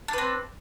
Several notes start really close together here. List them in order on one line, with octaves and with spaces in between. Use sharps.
D4 B4 C4